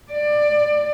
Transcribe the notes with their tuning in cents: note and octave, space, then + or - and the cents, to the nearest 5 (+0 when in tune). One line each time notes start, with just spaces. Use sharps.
D5 +20